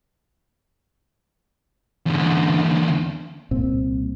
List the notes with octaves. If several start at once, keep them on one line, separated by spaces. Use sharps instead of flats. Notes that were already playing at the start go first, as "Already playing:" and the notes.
E2 D3
C2 A#2 C4